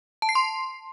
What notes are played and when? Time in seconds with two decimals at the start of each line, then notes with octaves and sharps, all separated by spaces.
0.22 A5
0.29 C7
0.35 C6